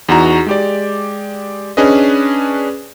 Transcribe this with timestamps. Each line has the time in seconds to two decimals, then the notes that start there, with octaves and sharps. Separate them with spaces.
0.09 E2 D#4 F#4 A#5
0.47 G#3 G4 D5
1.77 C#4 D4 G#4 B4 D#5